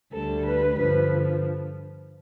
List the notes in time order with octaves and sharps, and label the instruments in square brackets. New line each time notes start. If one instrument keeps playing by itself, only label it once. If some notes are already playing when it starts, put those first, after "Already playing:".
[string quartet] D2 D3 G3 A4
B4
G2 D3 F3 B4